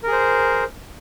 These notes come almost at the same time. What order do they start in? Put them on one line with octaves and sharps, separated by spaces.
A#4 G#4 C5